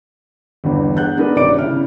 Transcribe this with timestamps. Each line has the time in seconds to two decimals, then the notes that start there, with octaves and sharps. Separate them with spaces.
0.64 G1 E2 G2
0.97 G#4 F#5 F#6 G6
1.17 B3 D4 D#4 G#4 A#4 B4
1.36 G#1 C3 C#4 D5 D6 D7
1.59 C#3 E4 F6